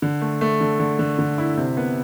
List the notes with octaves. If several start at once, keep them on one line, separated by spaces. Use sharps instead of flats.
D3
A3
A3
D3
D3
D3
D3
E4
C3
B3